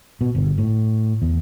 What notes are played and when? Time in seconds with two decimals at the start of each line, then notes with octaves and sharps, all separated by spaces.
0.21 B2
0.35 G1
0.58 A2
1.22 E2